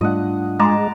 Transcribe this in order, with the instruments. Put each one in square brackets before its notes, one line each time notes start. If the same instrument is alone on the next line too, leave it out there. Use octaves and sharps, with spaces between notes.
[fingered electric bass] G#2 G3 A3 [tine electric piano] D4 F4 [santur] D#5 F#5
[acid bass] G#3 [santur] A5 A#5 D6